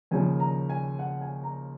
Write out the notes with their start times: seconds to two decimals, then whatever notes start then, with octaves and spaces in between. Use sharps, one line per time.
0.11 D#2 C#3 F3 A#3 G#5
0.40 A#5
0.69 G#5
0.99 F#5
1.21 G#5
1.44 A#5